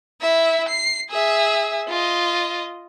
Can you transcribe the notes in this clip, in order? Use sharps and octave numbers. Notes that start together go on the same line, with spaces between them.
E4 E5
C7
G#4 E5
F4 D#5